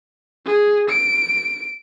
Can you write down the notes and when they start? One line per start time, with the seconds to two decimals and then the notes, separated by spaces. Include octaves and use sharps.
0.46 G#4
0.90 D7